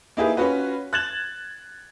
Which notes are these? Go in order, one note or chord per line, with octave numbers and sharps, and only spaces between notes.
A#3 D#4 E4 G4 G#4 B4
C#4 F4 F#4 B4
F#6 G#6 A6 E7 F#7